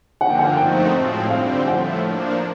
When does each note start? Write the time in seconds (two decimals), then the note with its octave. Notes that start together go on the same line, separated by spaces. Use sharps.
0.20 D3 F3 A#3 F#5
0.30 G5
0.39 F#5
0.57 F3 A3 C4 D#4 F#4 G5
0.94 A2 F3 G#3 C4
1.30 D3 G3 C4 F5
1.68 A2 F3 A3 F#5
2.04 F3 A#3 D4